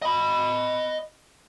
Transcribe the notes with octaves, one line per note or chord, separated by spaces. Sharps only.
D#5 B5